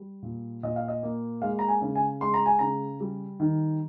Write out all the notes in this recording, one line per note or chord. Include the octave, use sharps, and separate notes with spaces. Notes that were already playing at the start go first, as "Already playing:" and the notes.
Already playing: G3
A#2
A#2 D#5
F5
D#5
A#3
G#3 F5
A#5
G#5
C#3
G#5
G#3 C6
A#5
G#5
C#3 A#5
G3
D#3